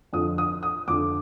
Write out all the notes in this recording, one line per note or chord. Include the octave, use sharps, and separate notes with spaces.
F2 D3 F3 D#6
D#6
D#6
F2 D3 F3 D6